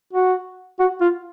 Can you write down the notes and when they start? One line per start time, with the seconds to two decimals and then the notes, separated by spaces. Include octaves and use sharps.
0.13 F#4
0.80 F#4
1.01 F4